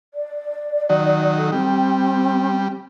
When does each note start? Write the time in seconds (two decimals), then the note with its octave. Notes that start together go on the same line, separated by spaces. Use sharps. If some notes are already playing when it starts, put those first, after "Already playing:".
0.14 D5
0.89 D#3 F#3
1.37 A4
1.52 G3 C4